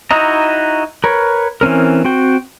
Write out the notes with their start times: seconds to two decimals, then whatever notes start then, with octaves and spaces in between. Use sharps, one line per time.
0.11 D#4 E4 F#4 D#5 A#5
1.04 A#4 B4 C#5
1.61 E3 C4 C#4 A#4
2.05 C4 F#4 G5